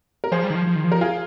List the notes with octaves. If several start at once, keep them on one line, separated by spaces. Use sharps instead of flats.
A#4
F3 G#4 C5
G3
D#3
F3
F3
D#3
F3
A#4
F4 G#4